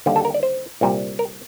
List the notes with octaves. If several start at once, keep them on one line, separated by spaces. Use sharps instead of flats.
D#2 D3 G3
A4
A#4
D5
C5
C2 A#2 G3
A#4